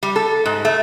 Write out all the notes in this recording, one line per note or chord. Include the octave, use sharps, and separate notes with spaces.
G3
A4
G#2
A3